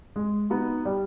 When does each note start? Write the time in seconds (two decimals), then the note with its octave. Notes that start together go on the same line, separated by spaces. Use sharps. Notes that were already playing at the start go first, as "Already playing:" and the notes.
0.16 G#3
0.50 B3 D#4 F#4
0.85 G3